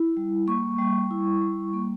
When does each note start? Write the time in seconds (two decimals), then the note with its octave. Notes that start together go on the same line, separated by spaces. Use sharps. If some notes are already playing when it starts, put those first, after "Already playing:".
Already playing: E4
0.17 G3
0.47 A#3 C#6
0.78 G3
1.11 E4
1.41 G3
1.73 A#3